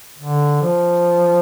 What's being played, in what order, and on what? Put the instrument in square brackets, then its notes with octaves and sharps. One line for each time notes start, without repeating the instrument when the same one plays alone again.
[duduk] D3
F3